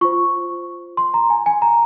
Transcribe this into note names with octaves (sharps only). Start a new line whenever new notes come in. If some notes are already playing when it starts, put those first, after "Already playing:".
F4 C5 C#6
C6
A#5
G#5
G#5
A#5